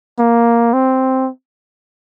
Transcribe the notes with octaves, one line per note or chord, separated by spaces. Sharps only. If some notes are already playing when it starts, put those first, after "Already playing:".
A#3
C4